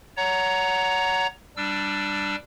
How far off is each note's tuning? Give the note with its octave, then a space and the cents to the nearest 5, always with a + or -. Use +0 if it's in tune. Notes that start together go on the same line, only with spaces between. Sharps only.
C#5 +25 F#5 +0 A#5 +0
G3 +0 D4 +5 E6 +25